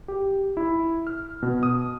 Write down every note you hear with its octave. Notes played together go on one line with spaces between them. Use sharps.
G4
E4
F6
B2
D#6